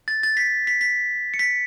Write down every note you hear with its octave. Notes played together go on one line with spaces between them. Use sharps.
A6
A6
B6
B6
B6
C#7
B6